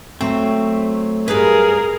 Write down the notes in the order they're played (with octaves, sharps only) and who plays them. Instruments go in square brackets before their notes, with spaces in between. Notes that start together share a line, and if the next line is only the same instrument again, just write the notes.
[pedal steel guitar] F#3 A3 [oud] C4
[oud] G2 B4 [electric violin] G#4 A#4